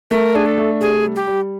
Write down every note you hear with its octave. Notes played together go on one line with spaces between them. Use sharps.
A3 A#4
D4 G#4
A4
A3
C3 G#4
G3
G4
G3